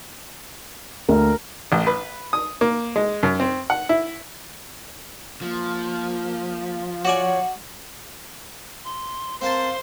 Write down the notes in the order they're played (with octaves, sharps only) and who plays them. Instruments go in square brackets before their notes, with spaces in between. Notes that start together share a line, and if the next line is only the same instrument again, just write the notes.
[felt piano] D2 [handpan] A#4
[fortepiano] A1
B4
D#6
A#3
G#3
F#2
C4
F#5
E4
[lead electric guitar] F3 [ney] A#3
[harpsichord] F#4 D5 G#5 [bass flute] C#5 [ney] F#5
[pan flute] C6
[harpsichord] C4 A#4 A5 [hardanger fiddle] C5 [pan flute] F5 [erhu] C6